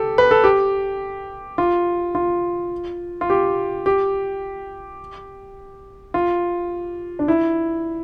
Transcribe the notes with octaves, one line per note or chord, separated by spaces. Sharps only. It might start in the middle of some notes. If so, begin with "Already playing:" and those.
Already playing: G4 A4
B4
A4
G4
F4
F4
F4
G4
G4
F4
D4
E4